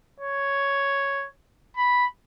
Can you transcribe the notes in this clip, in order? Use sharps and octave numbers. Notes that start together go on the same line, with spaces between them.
C#5
B5